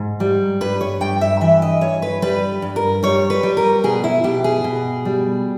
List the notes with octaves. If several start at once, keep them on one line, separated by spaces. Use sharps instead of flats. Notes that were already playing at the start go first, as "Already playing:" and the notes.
Already playing: G#2
G3
G2 B4
C#5
G2 G5
E5
E3 E5
D#5
G2 C#5
B4
G3 B4
G2
A#4
G3 C#5
B4
G3
A#4
B2 G#4
E4
B2 G4
G#4
B2
G3